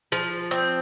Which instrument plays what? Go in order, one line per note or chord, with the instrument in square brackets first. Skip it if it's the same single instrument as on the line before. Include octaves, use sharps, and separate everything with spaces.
[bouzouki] F3
C4